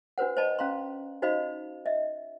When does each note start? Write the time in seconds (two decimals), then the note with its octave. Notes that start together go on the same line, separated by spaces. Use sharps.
0.18 D4 F#4 B4 C5 F#5
0.37 C5 D5 D#5 A5 B5
0.59 C#4 F5 A#5 C6
1.22 D#4 F#4 C5 D#5 F5 B5
1.86 D#5 E5